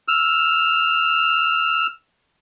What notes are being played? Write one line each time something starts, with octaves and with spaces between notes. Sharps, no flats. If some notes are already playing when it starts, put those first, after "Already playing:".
E6 F6